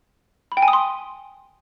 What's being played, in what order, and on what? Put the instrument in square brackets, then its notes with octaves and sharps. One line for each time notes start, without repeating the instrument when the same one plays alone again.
[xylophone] B5
G5
G#5
D#6
C6